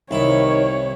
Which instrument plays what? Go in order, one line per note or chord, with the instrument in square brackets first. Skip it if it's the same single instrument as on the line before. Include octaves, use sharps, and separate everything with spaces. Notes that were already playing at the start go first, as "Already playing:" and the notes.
[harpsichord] C2 E4 [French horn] D#3 [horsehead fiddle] C#5